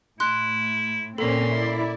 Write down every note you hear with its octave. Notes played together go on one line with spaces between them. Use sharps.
A2 E4 C6 F#6
A#2 A#3 C4 C#4 A4 C6
E4 D5